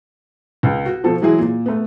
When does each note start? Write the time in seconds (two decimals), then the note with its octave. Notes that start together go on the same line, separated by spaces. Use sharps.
0.63 C#2
0.86 F#4
1.04 B2 F3 A4
1.22 E3 F#3 G#3 E4 G#4
1.39 A#2
1.66 A3 B3